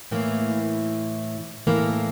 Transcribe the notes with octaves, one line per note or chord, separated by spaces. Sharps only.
A2 E3 A#3
A2 E3 A#3